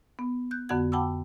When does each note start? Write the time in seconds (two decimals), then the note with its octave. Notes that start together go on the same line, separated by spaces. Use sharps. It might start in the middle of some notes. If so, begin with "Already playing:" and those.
0.19 B3
0.51 F#6 G6
0.69 F2 D3 B3 F#4 F#5 G#6
0.92 F#5 G5 A5 B5 D6 E6